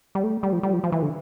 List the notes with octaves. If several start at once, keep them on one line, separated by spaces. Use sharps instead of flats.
G3
A3
G3
F3
G3
F3
F3
E3
D3